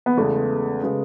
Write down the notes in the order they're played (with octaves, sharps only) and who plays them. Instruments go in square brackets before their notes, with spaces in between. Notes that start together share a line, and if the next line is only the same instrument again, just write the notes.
[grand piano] B3
[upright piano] E2 C#3 G#3 B3 [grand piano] A3
[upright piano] C#3 G#3 B3